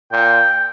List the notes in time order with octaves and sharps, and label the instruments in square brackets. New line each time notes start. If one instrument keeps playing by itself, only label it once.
[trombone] A#2 [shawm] G5